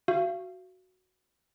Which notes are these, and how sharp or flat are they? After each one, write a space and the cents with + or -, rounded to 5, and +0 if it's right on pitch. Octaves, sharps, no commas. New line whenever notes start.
F#4 +0 F5 -35